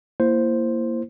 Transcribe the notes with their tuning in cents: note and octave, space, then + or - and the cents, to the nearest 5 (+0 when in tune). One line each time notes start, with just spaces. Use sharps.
A#3 +0 E4 +20 C5 +0